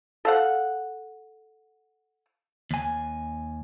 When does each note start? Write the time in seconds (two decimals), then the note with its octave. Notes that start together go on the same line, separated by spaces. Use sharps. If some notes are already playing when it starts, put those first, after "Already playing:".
0.25 A4 F5 F#5
2.71 D#2 G#5